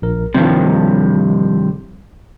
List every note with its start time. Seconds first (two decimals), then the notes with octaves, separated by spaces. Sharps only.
0.02 A#1 A#4
0.34 G2 C3 D#3 F3 G3